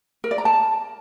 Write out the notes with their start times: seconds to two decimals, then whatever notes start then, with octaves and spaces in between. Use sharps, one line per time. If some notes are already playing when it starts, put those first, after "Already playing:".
0.24 A#4
0.31 D5
0.38 A#5
0.45 A5